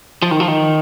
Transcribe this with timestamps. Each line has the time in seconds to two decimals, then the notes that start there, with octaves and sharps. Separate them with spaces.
0.22 F3
0.31 D#3
0.40 F3
0.48 D#3